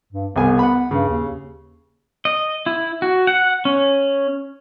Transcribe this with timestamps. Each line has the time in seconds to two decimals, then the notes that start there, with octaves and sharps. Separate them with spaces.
0.13 G2
0.36 C2 B3 G#4 G#5
0.59 F#5 B5
0.91 G2 C#3
1.08 D#2
2.25 D#5
2.66 E4
3.02 F#4
3.27 F#5
3.65 C#4